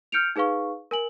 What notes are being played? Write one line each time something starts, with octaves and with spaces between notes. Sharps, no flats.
F6 G6 C#7 D7 F7
D#4 G#4 B4 F5 C#6
A#4 G#5 F#7